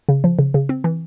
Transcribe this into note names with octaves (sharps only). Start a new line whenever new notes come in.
C#3
F3
C#3
C#3
C4
E3